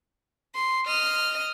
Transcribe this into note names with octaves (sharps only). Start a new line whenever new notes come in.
C6
D#5 F6